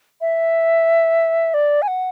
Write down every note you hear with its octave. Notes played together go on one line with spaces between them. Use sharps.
E5
D5
G#5
F#5